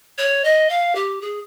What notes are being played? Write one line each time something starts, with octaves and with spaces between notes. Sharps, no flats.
C#5
D#5
F5
G4
G#4